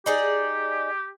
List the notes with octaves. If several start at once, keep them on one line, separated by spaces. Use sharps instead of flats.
D#4 G4 G#4 D5